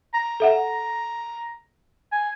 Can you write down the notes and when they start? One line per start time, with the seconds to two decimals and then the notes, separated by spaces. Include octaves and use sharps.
0.14 A#5
0.40 A4 E5 F#5
2.12 G#5